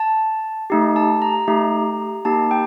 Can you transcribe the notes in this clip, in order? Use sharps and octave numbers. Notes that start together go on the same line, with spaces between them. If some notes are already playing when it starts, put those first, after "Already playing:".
Already playing: A5
A3 D#4 G4
A5
A#5
A3 D#4 G4
A#3 D#4 G4 A5
G5